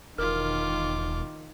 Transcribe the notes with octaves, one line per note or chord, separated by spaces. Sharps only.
E1 D#3 F4 A#4 D6 F6